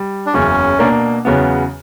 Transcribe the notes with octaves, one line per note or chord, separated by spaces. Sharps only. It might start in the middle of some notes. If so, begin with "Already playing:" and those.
Already playing: G3
D4
F#1 E2 C#3 F#3 C#4
B2 A#3 D4 A#4 D5
E2 C#3 F#3 B3